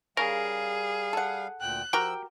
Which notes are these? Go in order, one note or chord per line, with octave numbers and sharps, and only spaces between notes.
C#3 G3 G#4 A#4 F5
A4 F#5
D2 A#2 G5 F#6
F3 F#4 G4 A#4 G5 E6